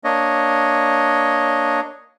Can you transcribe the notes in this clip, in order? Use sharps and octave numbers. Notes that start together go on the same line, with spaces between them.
A#3 D4 C#5 D#5